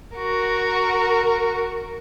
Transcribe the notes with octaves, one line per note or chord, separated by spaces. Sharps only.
F#4 A#4